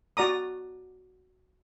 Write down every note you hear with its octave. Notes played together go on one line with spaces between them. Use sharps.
F#4 D5 A#5 D#6